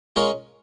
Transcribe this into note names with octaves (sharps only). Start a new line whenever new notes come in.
G#3 C#4 F4 A#4 C#5